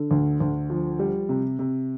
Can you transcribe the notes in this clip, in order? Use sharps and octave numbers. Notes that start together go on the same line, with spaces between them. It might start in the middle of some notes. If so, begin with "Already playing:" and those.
Already playing: D3
D2
D2
F3
G3
C3
C3